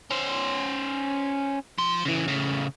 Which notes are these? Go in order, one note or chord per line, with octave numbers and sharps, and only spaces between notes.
C#4 C5
F3 C6
C#3 E3
A2 C#3